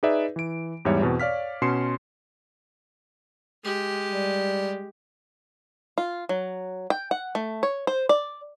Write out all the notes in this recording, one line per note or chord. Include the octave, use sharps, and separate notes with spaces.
D#4 G#4 B4 D5 E5
E3 D7
E2 G#2 G3 C#5 E5
E2 B2 C4
C#5 D5 F5 F6 B6
B2 C#4 C6 C7 C#7 E7
G#3 G4
G3
F4
F#3
G5
F#5
A3
C#5
C5
D5